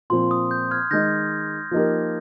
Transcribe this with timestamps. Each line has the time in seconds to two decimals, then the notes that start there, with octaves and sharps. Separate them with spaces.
0.10 A#2 F3 C4 C6
0.31 D#6
0.51 G6
0.71 F6 G#6
0.90 D#3 G#3 D#4 G6 A#6
1.71 F3 A#3 D#4 G4 A#4